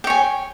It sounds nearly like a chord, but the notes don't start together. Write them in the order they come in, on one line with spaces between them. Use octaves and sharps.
G5 C#5 G#5